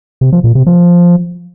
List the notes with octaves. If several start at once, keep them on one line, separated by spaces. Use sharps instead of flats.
C3
F3
A#2
C3
F3